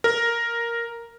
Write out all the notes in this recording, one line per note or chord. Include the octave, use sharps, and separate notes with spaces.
A#4